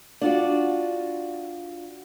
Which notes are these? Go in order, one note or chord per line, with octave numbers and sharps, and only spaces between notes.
D4 F4 F#4